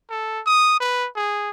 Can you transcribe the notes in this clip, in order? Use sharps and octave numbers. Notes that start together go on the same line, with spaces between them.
A4
D#6
B4
G#4